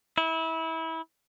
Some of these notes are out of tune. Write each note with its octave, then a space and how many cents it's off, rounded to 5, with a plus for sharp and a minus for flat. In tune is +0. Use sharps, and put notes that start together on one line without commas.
E4 -25